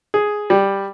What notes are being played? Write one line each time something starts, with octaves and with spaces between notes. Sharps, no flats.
G#4
G3